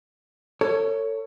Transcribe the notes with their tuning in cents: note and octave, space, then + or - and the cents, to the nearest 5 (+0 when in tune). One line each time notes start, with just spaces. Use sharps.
A4 +35 C#5 +0